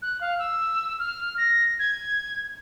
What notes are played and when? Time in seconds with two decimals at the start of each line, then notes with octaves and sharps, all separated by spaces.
0.02 F#6
0.21 F5
0.39 E6
0.99 F6
1.38 A#6
1.79 G#6